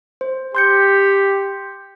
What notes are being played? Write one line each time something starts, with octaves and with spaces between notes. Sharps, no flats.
C5
G4 C6 G6 C#7